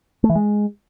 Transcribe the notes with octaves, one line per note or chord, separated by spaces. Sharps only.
A3
E3
G#3